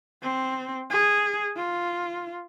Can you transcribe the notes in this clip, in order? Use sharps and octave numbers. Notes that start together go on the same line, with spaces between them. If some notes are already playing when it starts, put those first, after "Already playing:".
C4
G#4
F4